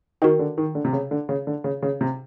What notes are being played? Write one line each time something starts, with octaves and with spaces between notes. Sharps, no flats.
D#3 F#4 A#4 D#5 G5
D3
D#3
D3
C3
C#3
D3
C#3
D3
C#3
C#3
C3